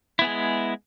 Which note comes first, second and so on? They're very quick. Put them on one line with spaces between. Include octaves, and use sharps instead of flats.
E4 B3 G#4 G#3